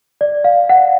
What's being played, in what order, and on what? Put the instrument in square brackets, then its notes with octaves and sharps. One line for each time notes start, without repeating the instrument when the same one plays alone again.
[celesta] D5
F5
F#5